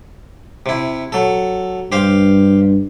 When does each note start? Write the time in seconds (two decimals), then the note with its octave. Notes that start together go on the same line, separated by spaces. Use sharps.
0.66 C3 E4
1.12 F#3 A4
1.92 G2 G4 C5 F5